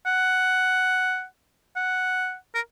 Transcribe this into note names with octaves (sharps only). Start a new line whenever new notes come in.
F#5
F#5
A#4